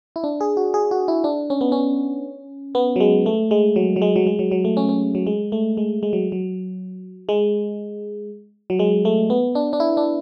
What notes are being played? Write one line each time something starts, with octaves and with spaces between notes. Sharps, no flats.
E4
D4
G#4
F#4
G#4
F#4
E4
D4
C#4
B3
C#4
B3
F#3
G#3
A3
G#3
F#3
F#3
G#3
F#3
G#3
F#3
F#3
A3
C#4
C#4
F#3
G#3
A3
G#3
G#3
F#3
F#3
G#3
F#3
G#3
A3
B3
D4
D4
E4
D4